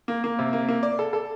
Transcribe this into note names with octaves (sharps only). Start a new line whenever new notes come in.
A#3
A#3
C3
A#3
A#3
D5
A4
A4